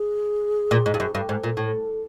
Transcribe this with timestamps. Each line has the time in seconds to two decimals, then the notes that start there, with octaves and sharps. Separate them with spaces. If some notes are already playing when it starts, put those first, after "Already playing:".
Already playing: G#4
0.71 A#2
0.86 G#2
0.94 G2
1.00 F#2
1.15 G2 A4
1.29 G#2
1.44 A#2
1.57 A2